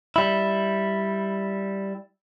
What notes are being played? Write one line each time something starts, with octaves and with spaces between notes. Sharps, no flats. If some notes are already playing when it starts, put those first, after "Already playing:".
G3 E4